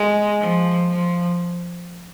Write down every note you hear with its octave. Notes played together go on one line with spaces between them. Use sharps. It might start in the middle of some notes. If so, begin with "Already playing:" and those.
Already playing: G#3
F3
F3